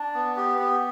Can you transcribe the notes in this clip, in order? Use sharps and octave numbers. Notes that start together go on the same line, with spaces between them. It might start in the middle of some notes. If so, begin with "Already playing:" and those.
Already playing: D4
B3
G4
B3